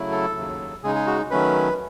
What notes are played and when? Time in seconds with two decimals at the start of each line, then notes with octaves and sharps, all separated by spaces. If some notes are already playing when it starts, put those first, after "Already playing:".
Already playing: C#3 F#3 A3 E4
0.12 A4
0.36 D#2 C#3 F#3
0.83 C#3 G#3 D#4 G#4
0.95 G#4
1.07 F#4
1.31 D#3 F#3 A3 C#4 B4